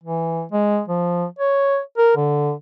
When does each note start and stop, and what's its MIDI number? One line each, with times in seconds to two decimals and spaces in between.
0.04 0.43 52
0.52 0.81 56
0.88 1.25 53
1.39 1.79 73
1.98 2.13 70
2.16 2.52 50